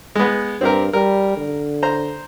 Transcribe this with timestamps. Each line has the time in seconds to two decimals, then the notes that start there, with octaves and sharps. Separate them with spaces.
0.15 G#3 B3
0.61 G2 C4 G4 A#4
0.93 G3 A#4
1.37 D3
1.83 C5 A#5